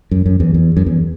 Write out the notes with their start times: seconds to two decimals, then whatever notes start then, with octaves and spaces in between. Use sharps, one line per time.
0.11 F#2
0.26 F#2
0.40 E2
0.54 E2
0.77 F#2
0.86 E2